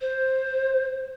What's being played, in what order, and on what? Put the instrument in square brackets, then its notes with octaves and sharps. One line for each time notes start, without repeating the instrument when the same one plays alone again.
[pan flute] C5